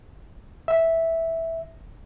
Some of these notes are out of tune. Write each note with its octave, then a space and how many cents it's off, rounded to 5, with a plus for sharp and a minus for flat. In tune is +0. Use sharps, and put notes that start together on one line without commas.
E5 -5